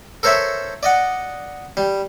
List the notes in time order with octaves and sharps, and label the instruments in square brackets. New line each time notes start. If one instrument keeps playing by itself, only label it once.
[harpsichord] A4 A#4 C5 C#5 E5
D5 D#5 F#5
G3